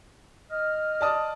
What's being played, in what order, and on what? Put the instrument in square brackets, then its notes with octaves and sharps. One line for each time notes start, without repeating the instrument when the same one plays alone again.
[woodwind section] D#5 F6
[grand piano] D5 A5 D#6